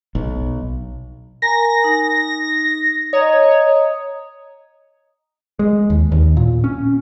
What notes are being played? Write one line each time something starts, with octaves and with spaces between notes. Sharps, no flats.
B1
A#4 G#5 A#5 A#6
D#4
C#5 D#5 A#5 D#6
G#3
D#2
D#2
A#2
C#4